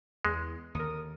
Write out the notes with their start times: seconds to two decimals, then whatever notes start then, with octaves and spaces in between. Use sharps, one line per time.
0.25 E2 G#3
0.75 D#2 D3 A#4 D#6